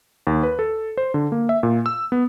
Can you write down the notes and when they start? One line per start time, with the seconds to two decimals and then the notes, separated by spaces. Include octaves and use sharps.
0.27 D#2
0.43 B4
0.59 A4
0.97 C5
1.14 D3
1.32 A#3
1.49 E5
1.63 A#2
1.86 E6
2.12 B3